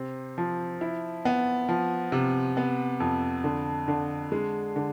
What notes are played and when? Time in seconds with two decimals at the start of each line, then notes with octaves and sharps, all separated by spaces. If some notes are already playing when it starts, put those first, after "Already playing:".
Already playing: C3 C4
0.38 F3
0.81 E4
1.25 B3
1.69 F3
2.12 C3
2.57 B3
3.00 F2
3.44 D3
3.88 D3
4.32 G#3
4.76 D3